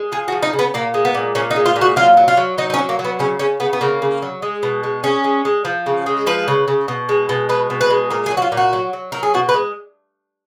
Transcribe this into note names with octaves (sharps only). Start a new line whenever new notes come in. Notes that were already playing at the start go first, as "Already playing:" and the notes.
Already playing: G#3
F3 G#4
F#4
F3
D#4
C#3
B3
A#2 A#3
G#3
B3
A#2
A#2 C#4
D#4
G#3
F4
A#2
F#4
F#3 F4
F#3
F4
F#3
F#3 D#4
D#4
C#4
F#3
A#3
F#3
B3
C#3 C#4
C#3 C#4
C#3 B3
B3
C#3 A#3
C#3
F#3
G#3
B2
G#3
G#3 C#4
G#3
G#3
F3
C#3
G#3
F3 B4
C#3
C#3
B2
G#3
B2
G#3 B4
B2
B4
G#3
A#2 A#4
G#4
F#3
F#4
F4
A#2
F#4
F#3
F#3
F#3 A#4
G#4
B2 F#4
B4
G#3